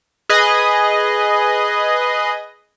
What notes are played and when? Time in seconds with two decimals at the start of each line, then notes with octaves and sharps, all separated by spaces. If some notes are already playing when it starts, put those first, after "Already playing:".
0.29 G#4 B4 D#5